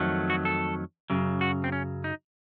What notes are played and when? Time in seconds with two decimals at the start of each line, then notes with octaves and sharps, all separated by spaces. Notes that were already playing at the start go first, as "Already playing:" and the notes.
Already playing: F2 D#3 F#3 A3
0.30 F#4
0.45 A4
1.10 F#2 C#3 F#3
1.41 F#4
1.64 C4
1.72 C#4
2.04 D#4